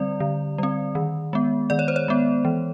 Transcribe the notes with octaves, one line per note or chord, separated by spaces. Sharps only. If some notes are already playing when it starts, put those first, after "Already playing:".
Already playing: D3 G3 C4 D5
D3
G3 C4
D#3
G#3 B3
D#3 D5
C#5
C5
C#5
G#3 B3
E3